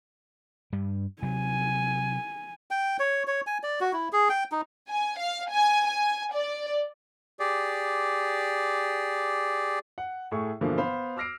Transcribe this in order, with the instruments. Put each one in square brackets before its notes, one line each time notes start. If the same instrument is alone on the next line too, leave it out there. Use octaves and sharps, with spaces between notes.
[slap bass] G2 G3
[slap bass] C3 F#3 [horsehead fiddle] G#5
[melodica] G5
C#5
C#5
G#5
D5
F#4
E4
G#4
G5
D#4
[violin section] G#5
F5
G#5
G#5
D5
[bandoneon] G4 G#4 D5
[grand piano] F#5
A2 A3 G#4 C#6
G2 B2 D3 E3 F3 A#3
B3 C5 F5 B5
D6 E6 F6 A#6 C7 D7